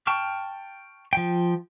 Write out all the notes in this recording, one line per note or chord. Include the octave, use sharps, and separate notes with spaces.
G5 A5 C#6 F6
F3 G5